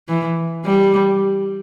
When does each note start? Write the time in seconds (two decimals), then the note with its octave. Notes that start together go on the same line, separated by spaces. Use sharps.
0.08 E3
0.64 G3